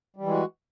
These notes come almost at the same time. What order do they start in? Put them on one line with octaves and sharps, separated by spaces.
G3 E3 G#3 F#4